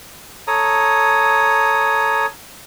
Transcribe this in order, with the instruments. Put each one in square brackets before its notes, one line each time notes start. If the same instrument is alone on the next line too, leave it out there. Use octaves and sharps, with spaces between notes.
[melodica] A4 C#5 A#5 D#6